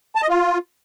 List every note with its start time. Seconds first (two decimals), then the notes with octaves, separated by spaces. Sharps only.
0.15 A5
0.22 D#5
0.29 F4